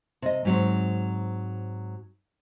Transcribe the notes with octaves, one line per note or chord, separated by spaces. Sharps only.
C3 D#5
G#2 F#3 C4